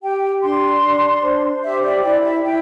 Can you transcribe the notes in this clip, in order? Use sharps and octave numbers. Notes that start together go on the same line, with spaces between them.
G4 G5
D4 C6
D4
C5
G4 E5
D5
E4 D5
E5
E4 G5